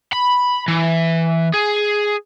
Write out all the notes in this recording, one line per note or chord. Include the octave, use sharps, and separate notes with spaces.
B5
E3
G#4